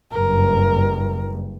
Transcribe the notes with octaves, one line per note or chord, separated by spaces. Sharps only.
F#1 G2 A#4